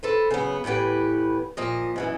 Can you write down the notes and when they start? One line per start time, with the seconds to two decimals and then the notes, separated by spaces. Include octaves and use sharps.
0.03 A4 B4 C5
0.31 C#3 F#3 B3
0.64 A2 E3 B3 G4 B4
1.57 A#2 F3 D#5
1.96 F#2 B2 E3